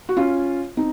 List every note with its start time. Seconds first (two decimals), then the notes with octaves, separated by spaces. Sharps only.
0.09 F#4
0.17 C#4 F4
0.77 C4 D#4